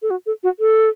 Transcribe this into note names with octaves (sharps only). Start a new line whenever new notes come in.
A4
F#4
A4
F#4
A4